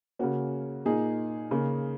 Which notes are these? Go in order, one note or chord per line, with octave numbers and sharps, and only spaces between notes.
C#3 A#3 C#4 F#4
A#2 A#3 D#4 G#4
C#3 A#3